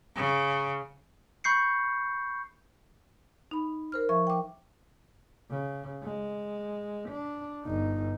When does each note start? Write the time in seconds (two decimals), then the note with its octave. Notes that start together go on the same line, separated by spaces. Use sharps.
0.16 C#3
1.44 B5 C#6 G6 C7 C#7
3.51 D#4 B5
3.92 A#4 C5 F6
4.09 F3 E5 C#6
4.27 G5 D6
5.50 C#3
6.03 G#3
7.09 D4
7.65 G1 D#4